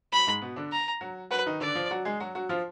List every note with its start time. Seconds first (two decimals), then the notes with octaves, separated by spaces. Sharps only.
0.12 F#3 B5
0.27 G#2 G#3
0.42 B2 B3
0.56 D3 D4
0.72 A#5
1.01 F#3 F#4
1.31 F#3 F#4 B4
1.46 D#3 D#4
1.60 D3 D4 D5
1.75 F3 F4
1.91 F#3 F#4
2.05 G#3 G#4
2.20 F#3 F#4
2.35 F#3 F#4
2.49 F3 F4